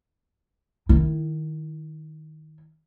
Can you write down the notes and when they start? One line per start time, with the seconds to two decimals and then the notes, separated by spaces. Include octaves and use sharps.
0.89 D#3 E4